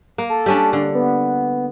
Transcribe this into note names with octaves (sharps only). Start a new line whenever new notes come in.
A#3
A4
G3 C#4 D4
D3
B3